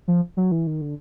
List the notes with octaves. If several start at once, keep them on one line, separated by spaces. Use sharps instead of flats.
F3
F#3
E3
D#3
D3